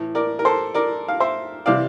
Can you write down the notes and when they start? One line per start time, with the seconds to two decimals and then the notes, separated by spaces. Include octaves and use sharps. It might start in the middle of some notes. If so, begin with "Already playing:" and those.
Already playing: A2 E3
0.15 A#4 D5
0.39 A#4
0.45 A4 C5
0.75 A#4 D5
1.08 F5
1.20 C5 E5
1.66 C3 E3 D5 F5